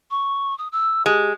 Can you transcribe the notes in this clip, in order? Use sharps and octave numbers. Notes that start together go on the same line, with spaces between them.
C#6
D#6
E6
G#3 G4